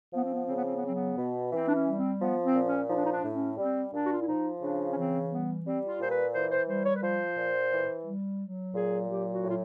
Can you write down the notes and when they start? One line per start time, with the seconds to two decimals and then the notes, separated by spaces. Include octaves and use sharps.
0.13 F3 B3
0.24 C4
0.34 B3
0.44 C#3 C4
0.54 B3
0.65 C4
0.75 B3
0.83 F#3 C4
0.95 B3
1.17 B2
1.51 E3 C4
1.68 D4
1.75 C#4
1.86 G3
1.97 C4
2.20 F3 B3
2.43 C4
2.55 A#2
2.66 C#4
2.89 F3 D#4
2.96 D4
3.03 D#4
3.12 D4
3.23 A2
3.35 C#4
3.58 G3 C4
3.93 A#2 D4
4.06 F#4
4.12 F4
4.20 E4
4.26 F3 D#4
4.61 C#3 D4
4.92 C#4
4.96 E3 C4
5.30 G3 B3
5.64 G3 C4
5.87 F4
5.99 A#2 C5
6.10 B4
6.34 E3 C5
6.51 C5
6.67 G3 C5
6.85 C#5
6.96 B4
7.02 F3 C5
7.37 A#2
7.72 E3
8.05 G3
8.41 F#3
8.74 A#2 G#4
9.09 F#3 G4
9.32 F#4
9.43 A2
9.49 F4